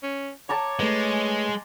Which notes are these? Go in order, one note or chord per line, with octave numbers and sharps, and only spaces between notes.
C#4
C#5 A5 A#5 D6
G#3 A3 B4